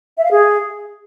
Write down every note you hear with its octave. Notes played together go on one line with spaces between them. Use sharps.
E5
F5
G#4